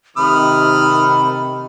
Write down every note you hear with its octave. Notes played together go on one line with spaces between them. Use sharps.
C3 D#3 A3 B5 D#6 F6